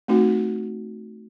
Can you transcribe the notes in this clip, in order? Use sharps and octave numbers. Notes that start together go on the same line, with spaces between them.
A3 C4 D#4 F#4